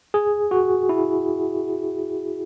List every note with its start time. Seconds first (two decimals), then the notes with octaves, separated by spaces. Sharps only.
0.14 G#4
0.51 F#4
0.89 E4